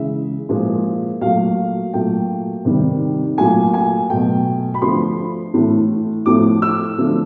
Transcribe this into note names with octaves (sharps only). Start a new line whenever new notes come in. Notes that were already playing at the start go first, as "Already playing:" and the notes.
Already playing: C#3 E3 G#3 E5
A#2 F3 G#3
A#2 F#3 A3 F5
A#2 F#3 A3 G5
C3 D#3 G3
A#2 F#3 A3 G#5
G#5
B2 F#3 A3 G5
B5
D3 F3 A3 C6
A2 E3 A3
A2 F3 A3 D6
E6
D3 F3 A3